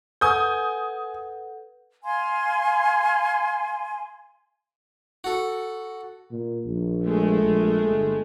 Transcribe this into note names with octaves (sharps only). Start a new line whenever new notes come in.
A4 B4 F#5 G#5 D#6 G6
F5 G#5 C6
F#4 A4
A#2
A#1
G#3 A3
A#1
G1